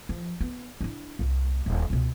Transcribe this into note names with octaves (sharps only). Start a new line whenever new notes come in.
F3
B3
D4 E4
C2 A#3
D#1
C#2 B2